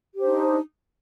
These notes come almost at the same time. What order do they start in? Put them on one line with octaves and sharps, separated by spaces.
G4 C5 D4 D#4